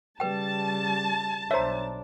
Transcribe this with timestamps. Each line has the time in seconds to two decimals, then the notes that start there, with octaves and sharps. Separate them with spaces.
0.20 C#3 G3 B4 G5 A5
1.51 B1 D4 C5 C#5 E5 A#5